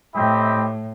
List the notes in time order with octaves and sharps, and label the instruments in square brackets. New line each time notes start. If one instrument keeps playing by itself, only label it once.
[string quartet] A2 [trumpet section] C4 E4 G4 D#5 G5